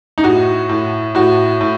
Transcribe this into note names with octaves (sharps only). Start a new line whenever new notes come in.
D#4
A2 F#4
A2
A2 F#4
A2